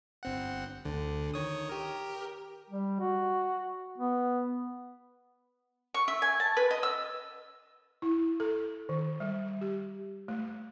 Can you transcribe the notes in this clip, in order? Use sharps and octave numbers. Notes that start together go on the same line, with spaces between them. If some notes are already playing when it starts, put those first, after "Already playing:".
G1 C4 F#5
D2 D3
D#3 C#5 D#6
G4 A#4
G3
F#4
B3
C#6
E5
G#5
A5
B4
D#5
E6
E4
A4
D#3
G3
G4
A3